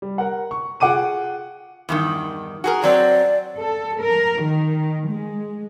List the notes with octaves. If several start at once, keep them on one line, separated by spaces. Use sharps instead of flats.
G3
A#4 F#5
C#6
F4 G#4 F#5 G5 D6 D#7
E2 G2 D#3
F#4 G#4 A#4
F#3 C4 D5
A4
A#4
D#3
G#3